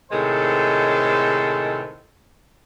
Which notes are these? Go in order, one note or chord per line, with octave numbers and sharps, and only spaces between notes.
A2 C3 D#3 G#3 A4 C5